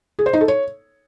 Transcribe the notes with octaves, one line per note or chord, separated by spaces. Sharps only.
G#4
C5
D#4
A4
C#5